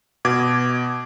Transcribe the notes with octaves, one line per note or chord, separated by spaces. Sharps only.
B2 D6 G#6